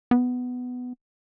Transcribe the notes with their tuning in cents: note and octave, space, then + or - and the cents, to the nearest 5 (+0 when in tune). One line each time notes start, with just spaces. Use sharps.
B3 +10